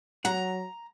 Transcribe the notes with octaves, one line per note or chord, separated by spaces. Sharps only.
F#3 F#5 A#5